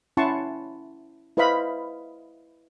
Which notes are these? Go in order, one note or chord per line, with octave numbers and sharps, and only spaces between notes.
C#4 E4 F#5 A5 C6 C#6
E4 B4 C5 D#5 F5 B5